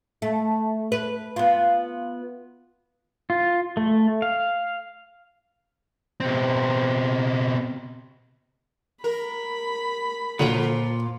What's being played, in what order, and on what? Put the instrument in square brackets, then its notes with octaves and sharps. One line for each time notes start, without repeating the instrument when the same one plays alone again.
[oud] A3
B4
B3 F4
[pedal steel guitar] F4
A3
F5
[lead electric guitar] B2 C4
[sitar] A#4 [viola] B5
[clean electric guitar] A#2 [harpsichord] D3 C#4 F#4 [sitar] F3 F4